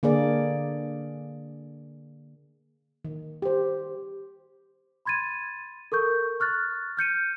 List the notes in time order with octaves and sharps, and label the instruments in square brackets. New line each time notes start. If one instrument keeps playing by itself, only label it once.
[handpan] D3 A#3 G#4 D5
D#3
G4 C5
[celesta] B5 C6 G#6 A6 D#7
A4 A#4 C#6 G6
C#6 F6 F#6 A6
F6 G6 C#7 D#7